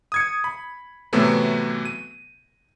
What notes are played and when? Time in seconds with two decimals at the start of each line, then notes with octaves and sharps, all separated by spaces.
0.12 D#6 G#6 C#7
0.44 B5
1.13 A2 C3 E3 F#3 A3 B3
1.85 D#7